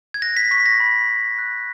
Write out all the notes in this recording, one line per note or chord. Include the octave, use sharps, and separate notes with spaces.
G#6
F#6 A#6
B6
C#6 B6
A#6
B5
B5
F#6